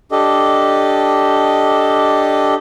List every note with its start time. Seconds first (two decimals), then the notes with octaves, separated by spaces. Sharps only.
0.12 D4 G4 A4 D#5